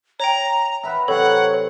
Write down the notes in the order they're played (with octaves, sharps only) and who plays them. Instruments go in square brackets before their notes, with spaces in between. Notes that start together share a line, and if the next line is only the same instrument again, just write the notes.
[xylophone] C#5 G5 [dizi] A#5
[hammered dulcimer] A#4 B4 F#5 [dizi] E5
[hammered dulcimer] C3 F#3 B4 [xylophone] A4 [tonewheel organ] C#5 [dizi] F#5